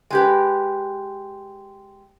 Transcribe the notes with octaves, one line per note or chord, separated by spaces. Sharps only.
G#3 G4 B4